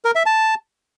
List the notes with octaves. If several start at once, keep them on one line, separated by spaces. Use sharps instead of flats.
A#4
E5
A5